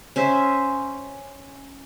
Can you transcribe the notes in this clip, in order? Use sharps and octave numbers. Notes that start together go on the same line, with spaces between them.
C#4 C5 E5